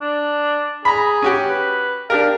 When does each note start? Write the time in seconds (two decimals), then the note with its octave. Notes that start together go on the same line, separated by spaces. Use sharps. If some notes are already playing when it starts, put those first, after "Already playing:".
0.01 D4
0.85 G#4 A#5 B5
1.22 C#4 F#4 G4
1.48 B4
2.10 D4 G4 A#4 F5